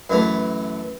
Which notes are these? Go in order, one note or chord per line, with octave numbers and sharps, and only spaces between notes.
F#2 E3 A3